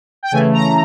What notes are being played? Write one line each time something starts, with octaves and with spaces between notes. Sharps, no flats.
G5
C#3 E3 A3 G#5
A#5